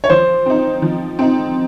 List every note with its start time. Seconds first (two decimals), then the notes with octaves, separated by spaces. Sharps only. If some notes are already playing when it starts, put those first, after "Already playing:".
0.04 C#5
0.10 F3 C5
0.46 C4 D#4
0.82 F3
1.19 C4 D#4